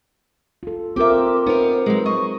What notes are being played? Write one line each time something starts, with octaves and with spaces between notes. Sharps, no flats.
F4 A4
C4 F4 G4 A#4 E5 D6
B3 D#4 A#4 C5
F#3 G#3
D#5 C#6